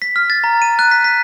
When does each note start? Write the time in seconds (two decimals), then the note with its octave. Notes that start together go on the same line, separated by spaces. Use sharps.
0.02 B6
0.16 F6
0.30 A6
0.44 A#5
0.62 D#7
0.79 F#6
0.91 B6
1.04 B6